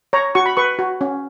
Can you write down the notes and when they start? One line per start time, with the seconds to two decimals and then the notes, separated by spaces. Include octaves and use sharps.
0.13 C#5 A#5
0.35 F#4 C#6
0.46 B5
0.57 B4 C#6
0.79 F#4
1.01 C#4